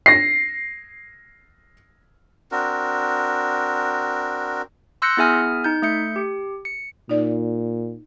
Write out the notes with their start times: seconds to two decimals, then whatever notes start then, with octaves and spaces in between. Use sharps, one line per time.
0.06 A#6 C7
2.52 C4 D4 F#4 A#4
5.02 C6 E6 F#6 G6 A#6 C#7
5.17 B3 E4 G#4 E5 G#5 F6
5.64 D#4 G6
5.82 A3 E5 G6 C#7
6.16 G4
6.65 C#7
7.09 A#2 D#4 D5